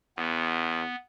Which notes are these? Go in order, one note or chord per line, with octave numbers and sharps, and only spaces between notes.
E2 B3